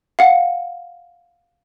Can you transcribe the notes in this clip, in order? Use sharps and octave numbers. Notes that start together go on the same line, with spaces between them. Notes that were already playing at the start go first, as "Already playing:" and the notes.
F5 F#5